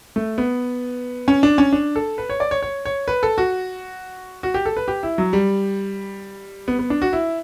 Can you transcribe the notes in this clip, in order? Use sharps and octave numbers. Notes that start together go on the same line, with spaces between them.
A3
B3
C#4
D4
C#4
D4
A4
B4
C#5
D5
C#5
C#5
C#5
B4
A4
F#4
F#4
G4
A4
B4
G4
E4
F#3
G3
B3
B3
D4
F#4
E4